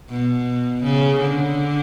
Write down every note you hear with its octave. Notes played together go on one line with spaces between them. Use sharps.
B2
C#3
D3